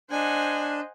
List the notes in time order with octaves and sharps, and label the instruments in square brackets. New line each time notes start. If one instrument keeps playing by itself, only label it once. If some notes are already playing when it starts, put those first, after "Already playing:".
[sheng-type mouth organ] D4 [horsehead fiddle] C5 D#5 [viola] F#5 G#5